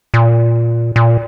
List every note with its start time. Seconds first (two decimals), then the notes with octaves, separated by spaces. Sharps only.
0.14 A#2
0.96 A#2